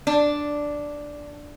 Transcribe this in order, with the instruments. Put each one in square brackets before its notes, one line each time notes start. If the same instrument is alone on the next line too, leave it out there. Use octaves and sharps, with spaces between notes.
[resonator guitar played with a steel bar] D4